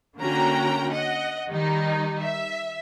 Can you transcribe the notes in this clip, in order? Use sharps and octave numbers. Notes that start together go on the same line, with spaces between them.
D3 A#3 C#4 F#4 G5 A#5
D#5 F#5
D#3 G3 D#4
E5